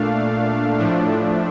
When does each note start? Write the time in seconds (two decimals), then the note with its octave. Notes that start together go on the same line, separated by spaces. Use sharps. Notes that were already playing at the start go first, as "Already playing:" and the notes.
Already playing: A#2 A3 D4 F5
0.78 A2 F3 A3 D4